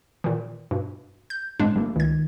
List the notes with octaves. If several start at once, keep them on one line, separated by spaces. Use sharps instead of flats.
A#2 D#3 E3
G2 B2
G6
G1 A2 G#3 C4 D4
G1 G3 A3 A#3
C#2 D#3 G#6